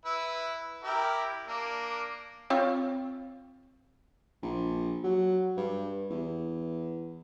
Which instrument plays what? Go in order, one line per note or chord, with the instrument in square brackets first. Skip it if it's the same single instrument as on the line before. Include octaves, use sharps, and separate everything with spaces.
[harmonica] E4 B4
E4 G4 A#4
A#3 D4
[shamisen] C4 F4 C#5
[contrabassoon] A#1
F#3
G2
E2